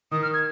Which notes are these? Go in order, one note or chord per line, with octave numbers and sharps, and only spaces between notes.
D#3 D#6
F6
G#6